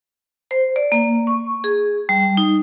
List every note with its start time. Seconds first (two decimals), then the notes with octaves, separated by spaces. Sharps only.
0.51 C5
0.76 D5
0.92 A#3
1.27 C#6
1.64 G#4
2.09 G3
2.37 D#4